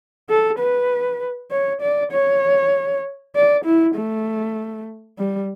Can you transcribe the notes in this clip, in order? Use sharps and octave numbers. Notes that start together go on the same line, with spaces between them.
A4
B4
C#5
D5
C#5
D5
E4
A3
G3